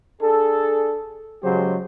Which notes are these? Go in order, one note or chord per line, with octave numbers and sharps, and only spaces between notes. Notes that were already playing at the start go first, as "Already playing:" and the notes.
D4 G#4 A4
C#3 F#3 G#3 G4 C5